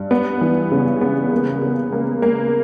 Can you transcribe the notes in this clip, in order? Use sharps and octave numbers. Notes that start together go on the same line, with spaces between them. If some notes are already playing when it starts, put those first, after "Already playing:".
Already playing: G2
B3
E3
C#3
B3
A#3
C#3
A#3
A#3